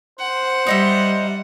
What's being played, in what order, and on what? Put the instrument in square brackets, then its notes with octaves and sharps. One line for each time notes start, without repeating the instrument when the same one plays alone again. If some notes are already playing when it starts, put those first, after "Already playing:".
[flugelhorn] C5 [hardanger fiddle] F#5
[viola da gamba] G3 [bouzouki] D#4 D#5 E5